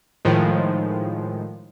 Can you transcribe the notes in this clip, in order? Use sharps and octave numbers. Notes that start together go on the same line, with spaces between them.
A2 D#3 F3 G#3